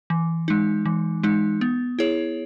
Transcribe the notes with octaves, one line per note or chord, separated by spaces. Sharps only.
E3
G#3 D#4
E3
G#3 D#4
B3
E4 G#4 C#5